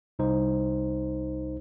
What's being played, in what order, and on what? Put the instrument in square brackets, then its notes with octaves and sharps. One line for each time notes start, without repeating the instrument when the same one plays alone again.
[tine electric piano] C2 D#4 C5